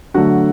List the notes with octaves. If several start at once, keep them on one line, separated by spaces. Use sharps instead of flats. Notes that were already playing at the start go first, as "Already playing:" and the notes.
D3 F#3 A3 F#4 F#5